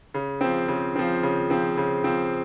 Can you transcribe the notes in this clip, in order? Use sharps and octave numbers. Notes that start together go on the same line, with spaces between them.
C#3
F3 C4
C#3
F3 C4
C#3
F3 C4
C#3
F3 C4